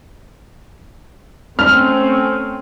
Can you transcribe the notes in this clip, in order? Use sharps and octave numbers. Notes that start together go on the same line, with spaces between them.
A3 C4 C#4 F6